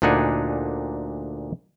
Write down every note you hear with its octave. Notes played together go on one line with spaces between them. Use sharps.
D2 A#2 D4 D#4 F#5 G#5